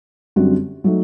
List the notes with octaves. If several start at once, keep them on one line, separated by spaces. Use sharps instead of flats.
F#2 D3 G3 C4 F#4
F#3 A3 D#4